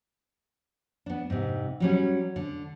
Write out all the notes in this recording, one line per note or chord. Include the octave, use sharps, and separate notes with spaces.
B3 D4
G#2 C3
F#3 G3 C#4
D3